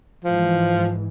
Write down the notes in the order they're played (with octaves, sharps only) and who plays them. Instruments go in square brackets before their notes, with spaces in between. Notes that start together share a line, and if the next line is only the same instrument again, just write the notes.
[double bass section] G#2 E3 [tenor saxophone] F3